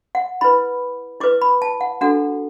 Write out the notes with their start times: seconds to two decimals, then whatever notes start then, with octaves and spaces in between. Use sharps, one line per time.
0.15 F#5
0.41 E4 B4 B5
1.21 E4 B4 D6
1.42 B5
1.62 A5
1.81 F#5
2.01 D4 F#4 A4 F#5